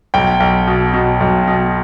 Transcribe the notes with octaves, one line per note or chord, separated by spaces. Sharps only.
B1 G5
B1
B2
B2
B1
B2